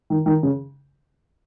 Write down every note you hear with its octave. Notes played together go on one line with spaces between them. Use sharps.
D#3
D#3
C#3